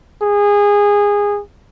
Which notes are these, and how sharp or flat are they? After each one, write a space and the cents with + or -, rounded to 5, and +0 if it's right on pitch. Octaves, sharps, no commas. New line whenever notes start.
G#4 -20